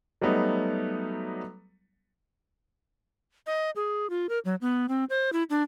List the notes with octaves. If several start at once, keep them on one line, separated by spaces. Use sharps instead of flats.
F#3 G3 A3 B3 D#4
D#5
G#4
F4
A#4
F#3
B3
C4
C5
E4
D4